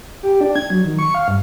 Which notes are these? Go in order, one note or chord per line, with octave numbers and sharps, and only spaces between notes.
G4
D4
G#6
F#3
D#3
C#6
F5
G2